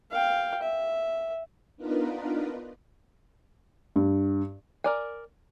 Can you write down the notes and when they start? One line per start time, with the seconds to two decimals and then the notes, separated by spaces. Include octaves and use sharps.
0.11 F5 G5
0.62 E5
1.77 B3 D4 D#4 F4 A#4 B4
3.96 G2
4.84 A#4 D5 G#5